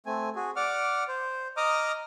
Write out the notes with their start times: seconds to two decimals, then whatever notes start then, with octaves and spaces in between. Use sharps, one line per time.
0.06 A3 C4 G#5
0.36 F#4 G#4
0.56 D5 F#5 D6 F6
1.08 C5
1.57 D#5 A#5 D6 D#6 F6